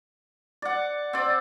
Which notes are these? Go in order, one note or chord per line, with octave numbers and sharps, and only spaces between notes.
D5 F#5
C4 D5